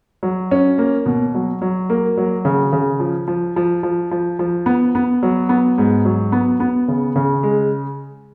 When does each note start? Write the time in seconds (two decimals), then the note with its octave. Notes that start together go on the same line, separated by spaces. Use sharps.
0.23 F#3
0.51 C#4
0.78 A#3
1.06 B2
1.34 F#3
1.62 F#3
1.89 A#3
2.17 F#3
2.45 C#3
2.73 C#3
3.00 F3
3.28 F3
3.56 F3
3.83 F3
4.11 F3
4.39 F3
4.66 B3
4.95 B3
5.23 F#3
5.49 B3
5.78 G#2
6.05 F#3
6.32 B3
6.60 B3
6.88 C#3
7.16 C#3
7.43 G#3